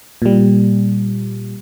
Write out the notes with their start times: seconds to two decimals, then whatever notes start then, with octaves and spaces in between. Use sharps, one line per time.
0.22 A#2 G3